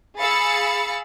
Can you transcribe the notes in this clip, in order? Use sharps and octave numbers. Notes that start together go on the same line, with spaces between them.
G#4 F5 B5 E6 A6 C#7